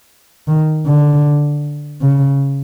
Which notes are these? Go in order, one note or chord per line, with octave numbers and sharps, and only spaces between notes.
D#3
D3
C#3